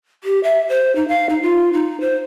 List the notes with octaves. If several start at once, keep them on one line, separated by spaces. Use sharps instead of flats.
G4
E5
C5
D#4
F5
D#4
F4
D#4
C5